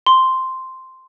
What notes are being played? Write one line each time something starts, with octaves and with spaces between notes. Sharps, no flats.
C6